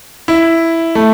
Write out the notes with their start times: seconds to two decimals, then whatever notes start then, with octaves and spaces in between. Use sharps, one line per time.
0.28 E4
0.95 A3